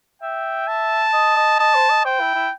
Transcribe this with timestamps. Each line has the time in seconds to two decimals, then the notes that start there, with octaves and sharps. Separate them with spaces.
0.22 E5 G5
0.68 A5
1.13 D#5
1.36 D#5
1.59 D#5 A5
1.75 C5
1.90 D#5
2.05 C5 G5
2.21 E4
2.35 E4